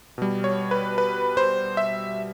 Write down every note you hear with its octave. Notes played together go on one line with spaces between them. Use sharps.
B2 G3
C#5
B4
B4
C5
E5